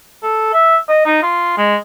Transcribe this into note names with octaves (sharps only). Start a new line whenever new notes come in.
A4
E5
D#5
D#4
F4
G#3